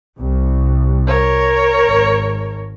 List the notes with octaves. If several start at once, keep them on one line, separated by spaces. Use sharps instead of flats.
C2
A#4 C#5
G#1